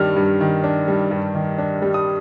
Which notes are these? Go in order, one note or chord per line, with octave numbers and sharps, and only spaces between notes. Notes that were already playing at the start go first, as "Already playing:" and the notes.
Already playing: G2 D#3 G3 D4 F6
G2
D#3
D4
G3
G2
D#3
D4
G3
D#6